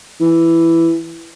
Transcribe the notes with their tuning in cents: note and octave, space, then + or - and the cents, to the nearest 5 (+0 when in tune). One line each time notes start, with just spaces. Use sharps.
E3 +5